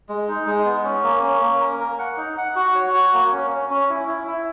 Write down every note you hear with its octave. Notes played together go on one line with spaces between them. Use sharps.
G#3
D#4
G#3
B3
C#4
A#3
C#4
A#3
A#4
A#4
F#5
D#4
F#5
F#4
C#5
F#4
A#3
C#4
C#4
C#4
E4
E4
E4